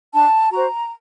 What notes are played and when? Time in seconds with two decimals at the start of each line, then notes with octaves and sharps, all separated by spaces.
0.13 D4 A5
0.51 F#4 C5 A#5